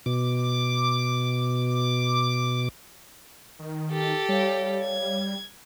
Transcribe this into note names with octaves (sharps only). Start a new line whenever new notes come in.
B2 D6
D#3
G4 A4
G3 C#5 F5
G#6